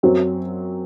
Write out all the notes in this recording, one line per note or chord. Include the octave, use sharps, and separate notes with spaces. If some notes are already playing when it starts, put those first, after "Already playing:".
F#2 F#3 C4